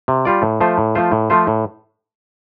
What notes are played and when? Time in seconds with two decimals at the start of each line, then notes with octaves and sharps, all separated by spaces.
0.08 C3
0.25 G3 F4 D5
0.42 A2
0.60 F3 A3 F4 C5
0.78 A2
0.95 F3 A3 F4 C5
1.12 A2
1.30 F3 A3 F4 C5
1.47 A2